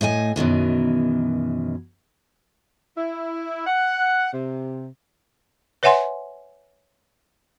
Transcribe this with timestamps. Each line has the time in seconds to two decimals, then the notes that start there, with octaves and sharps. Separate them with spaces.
0.01 A2 A3 D#5 G#5
0.36 F#2 B2 D#3 E3
2.98 E4
3.67 F#5
4.33 C3
5.83 B4 C#5 E5 F#5 G#5 C6